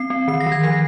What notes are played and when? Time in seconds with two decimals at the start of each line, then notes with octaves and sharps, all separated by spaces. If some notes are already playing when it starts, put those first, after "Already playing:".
Already playing: C4 C7
0.10 C4
0.28 D#3 C7
0.40 A#6
0.46 D#3
0.52 G#6
0.63 F3 C7